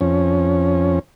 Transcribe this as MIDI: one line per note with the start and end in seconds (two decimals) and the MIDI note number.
0.01 0.99 41
0.01 0.99 61